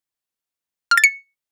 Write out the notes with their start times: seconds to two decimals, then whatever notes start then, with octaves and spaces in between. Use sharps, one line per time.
0.91 F6
0.97 A6
1.04 C#7